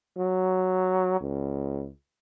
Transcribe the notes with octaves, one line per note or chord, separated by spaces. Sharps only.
F#3
C#2